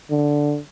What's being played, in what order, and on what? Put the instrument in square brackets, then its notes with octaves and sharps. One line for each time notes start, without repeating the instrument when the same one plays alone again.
[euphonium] D3